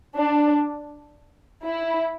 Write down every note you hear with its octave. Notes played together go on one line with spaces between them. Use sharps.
D4
E4